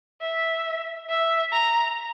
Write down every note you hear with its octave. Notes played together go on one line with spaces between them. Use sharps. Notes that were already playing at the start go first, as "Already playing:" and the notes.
E5
E5
A#5